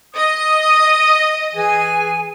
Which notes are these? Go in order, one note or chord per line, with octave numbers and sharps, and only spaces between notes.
D#5 D#6
E3 G#4 G#5